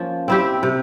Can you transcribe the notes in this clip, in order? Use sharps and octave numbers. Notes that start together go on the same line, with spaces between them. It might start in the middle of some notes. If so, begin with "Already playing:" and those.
Already playing: F3 A#3 C#4 F4
C4 E4 G4
C3